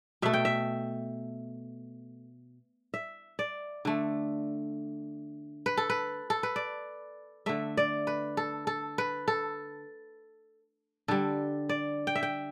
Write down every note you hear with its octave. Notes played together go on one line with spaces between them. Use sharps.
B2 A3 E5
G5
E5
E5
D5
D3 A3
B4
A4
B4
A4
B4
D5
D3 A3 E5
D5
B4
A4
A4
B4
A4
D3 G3 A4
D5
G5
E5
G5